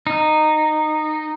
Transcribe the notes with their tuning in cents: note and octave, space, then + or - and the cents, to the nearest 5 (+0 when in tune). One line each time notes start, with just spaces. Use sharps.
D#4 -15